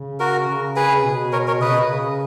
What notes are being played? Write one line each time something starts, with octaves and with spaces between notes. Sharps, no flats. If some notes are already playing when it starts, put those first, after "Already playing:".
Already playing: C#3
F#4 A#4
C#3
G#4 B4
B2
A#4 C#5
A#4 C#5
C#3 B4 D#5
B2
C#3